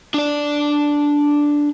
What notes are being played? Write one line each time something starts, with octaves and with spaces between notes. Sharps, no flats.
D4 D5